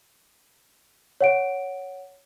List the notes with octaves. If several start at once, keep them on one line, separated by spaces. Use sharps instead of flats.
C#5 F#5 D7